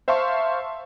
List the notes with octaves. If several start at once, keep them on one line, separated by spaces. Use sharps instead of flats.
C5 E5 F5 A5 C6 C#6